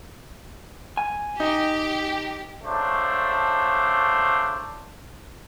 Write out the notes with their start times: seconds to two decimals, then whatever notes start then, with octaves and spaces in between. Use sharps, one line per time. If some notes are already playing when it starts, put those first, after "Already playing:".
0.97 G#5
1.40 D#4 G4
2.64 C#3 F#3 A3 D4 C5